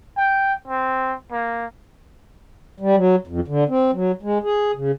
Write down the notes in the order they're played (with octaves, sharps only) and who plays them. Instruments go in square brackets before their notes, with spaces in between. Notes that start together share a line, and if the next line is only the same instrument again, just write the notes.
[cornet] G5
C4
A#3
[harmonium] G3
F#3
F2
D3
C4
F#3
G#3
G#4
C#3